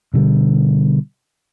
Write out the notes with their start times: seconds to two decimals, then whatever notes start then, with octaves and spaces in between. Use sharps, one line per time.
0.14 B2 D3 G3